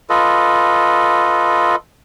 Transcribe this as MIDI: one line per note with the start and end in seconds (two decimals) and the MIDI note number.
0.10 1.76 65
0.10 1.76 69
0.10 1.76 71
0.10 1.76 75